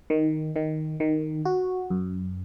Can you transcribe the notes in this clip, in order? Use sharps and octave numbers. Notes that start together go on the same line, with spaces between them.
D#3
D#3
D#3
F#4
F#2